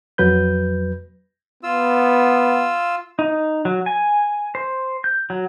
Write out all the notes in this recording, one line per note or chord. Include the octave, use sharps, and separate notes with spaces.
F2 F#3 B4 G6
B3 F4 E6
D#4
F#3
G#5
C5
G6
F#3